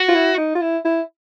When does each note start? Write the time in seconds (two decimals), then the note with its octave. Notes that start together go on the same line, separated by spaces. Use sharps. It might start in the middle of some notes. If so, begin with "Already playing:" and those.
Already playing: F#4
0.09 F4
0.15 E4
0.38 D#4
0.55 F4
0.61 E4
0.85 E4